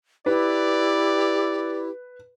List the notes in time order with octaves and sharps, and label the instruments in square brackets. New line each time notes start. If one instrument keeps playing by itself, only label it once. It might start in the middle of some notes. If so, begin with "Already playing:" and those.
[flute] E4 [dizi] G4 [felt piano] B4 [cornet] D5